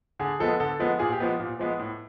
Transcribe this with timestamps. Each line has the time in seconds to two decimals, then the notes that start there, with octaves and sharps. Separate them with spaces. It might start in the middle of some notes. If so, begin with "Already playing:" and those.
0.19 D3 G#4
0.39 F3 G#3 B3 A4
0.60 D3 A4
0.80 F3 G#3 B3
0.99 A#2 G#4
1.12 G4
1.20 F3 G#3 B3
1.40 A#2
1.59 F3 G#3 B3
1.79 A2